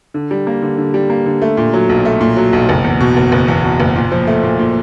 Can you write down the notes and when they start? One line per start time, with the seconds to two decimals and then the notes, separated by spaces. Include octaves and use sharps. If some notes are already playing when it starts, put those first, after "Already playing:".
0.14 D3
0.31 G3
0.47 A#3
0.62 D3
0.78 D3
0.94 G3
1.10 A#3
1.26 D3
1.42 A3
1.57 A#2
1.74 F#3
1.89 B1
2.05 A3
2.21 A#2
2.37 F#3
2.53 B1
2.69 F#1
2.84 E2
3.01 B2
3.17 F#1
3.32 F#1
3.48 E2
3.64 B2
3.80 F#1
3.96 A#2
4.12 F3
4.27 A3
4.43 A#2
4.59 A#2